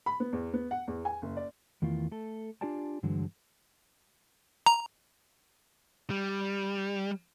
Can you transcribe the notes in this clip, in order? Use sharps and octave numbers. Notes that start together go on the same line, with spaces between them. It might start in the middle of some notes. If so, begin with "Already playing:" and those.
B5
B3
E2
B3
F#5
E2
G#5
F#1
D5
E2 D#3 A3 E4 F4
A3 A4
D4 F4 G4 D5 G#5 A5
G2 D3 E3 F#3 G#3
A#5
G3